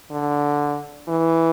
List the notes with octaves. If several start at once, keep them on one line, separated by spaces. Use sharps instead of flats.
D3
E3